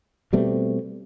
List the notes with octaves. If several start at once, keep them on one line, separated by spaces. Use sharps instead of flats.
B2 G3 A3 C4